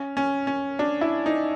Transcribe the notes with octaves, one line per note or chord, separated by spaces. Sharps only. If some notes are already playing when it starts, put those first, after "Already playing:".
Already playing: C#4
C#4
C#4
D4
E4
D#4